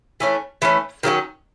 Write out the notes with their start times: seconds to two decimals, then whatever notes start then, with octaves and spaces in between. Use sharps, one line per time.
0.20 E3 A3 C#4
0.62 E3 A3 C#4
1.03 D#3 F#3 A3 C#4